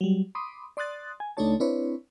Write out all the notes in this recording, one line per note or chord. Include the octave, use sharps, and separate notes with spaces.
F#3 G3
B5 C6 D6 D#6
D5 C6 D#6 F#6 A6
G#5
C#2 A3 D4 D#4 C#5 A5
C4 D4 E4 B4 C#5